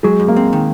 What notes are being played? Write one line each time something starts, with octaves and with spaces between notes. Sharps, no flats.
F#3 G#3
F#2
A#3
C4
D#3